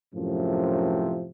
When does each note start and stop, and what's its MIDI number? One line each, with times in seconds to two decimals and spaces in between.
0.15 1.27 42
0.15 1.27 45
0.15 1.27 48
0.15 1.27 53